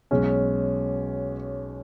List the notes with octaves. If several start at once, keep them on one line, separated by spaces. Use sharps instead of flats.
B1 B2 G#3 C#4